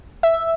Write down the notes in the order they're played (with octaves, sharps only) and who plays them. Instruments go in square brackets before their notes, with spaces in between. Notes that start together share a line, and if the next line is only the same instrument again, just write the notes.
[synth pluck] E5